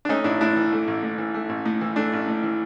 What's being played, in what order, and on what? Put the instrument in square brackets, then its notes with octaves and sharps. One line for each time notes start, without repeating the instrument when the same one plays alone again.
[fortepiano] D4
A3 C#4 D#4
A1 D4 E4
A2 D4 E4
E3
A3
A1
A2
E3
A3
A1
A2
E3
A3 D4
A1
A2
E3